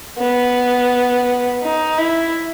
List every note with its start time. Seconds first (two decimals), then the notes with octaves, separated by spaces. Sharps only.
0.18 B3
1.62 D#4
1.98 E4